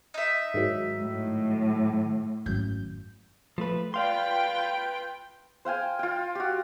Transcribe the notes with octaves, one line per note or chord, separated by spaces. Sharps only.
D#4 E5
G#2 D#3 F#3
A2
G#1 F#2 G6
F3 A3 B4
F4 B4 D5 F5 G5 C6
C5 F5 G5 G#5
F4 G5
F#4 G4